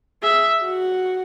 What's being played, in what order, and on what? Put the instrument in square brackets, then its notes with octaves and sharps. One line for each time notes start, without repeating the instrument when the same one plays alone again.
[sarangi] G#4 [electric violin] E5
[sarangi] F#4